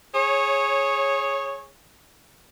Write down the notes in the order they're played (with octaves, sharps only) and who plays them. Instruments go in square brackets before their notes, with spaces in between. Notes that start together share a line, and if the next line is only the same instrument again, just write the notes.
[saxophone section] G#4 C#5